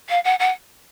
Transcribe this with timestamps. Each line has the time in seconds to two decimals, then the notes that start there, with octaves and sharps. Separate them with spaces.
0.09 F5
0.24 F#5
0.39 F#5